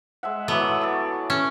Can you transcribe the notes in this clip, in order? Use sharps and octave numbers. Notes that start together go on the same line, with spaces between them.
G#3 E5 F#5
E3 F#3 A3 B3
D5 C#6
C#4